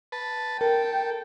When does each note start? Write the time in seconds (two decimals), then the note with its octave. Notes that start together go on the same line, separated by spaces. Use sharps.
0.12 B4 A5
0.61 A4 A#4 G5